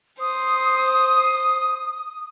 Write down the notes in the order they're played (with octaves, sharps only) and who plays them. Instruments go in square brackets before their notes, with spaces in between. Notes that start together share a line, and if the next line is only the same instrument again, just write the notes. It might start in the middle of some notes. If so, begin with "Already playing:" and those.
[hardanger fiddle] C5 [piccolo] D#6